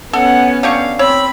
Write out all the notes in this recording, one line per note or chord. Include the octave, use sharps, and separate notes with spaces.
B3 C#4 A4 F#5
D3 G4 F5 C#6
C4 C#5 B5 E6